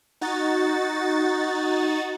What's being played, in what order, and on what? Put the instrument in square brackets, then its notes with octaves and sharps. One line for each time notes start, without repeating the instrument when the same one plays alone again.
[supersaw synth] D#4 F#4 A6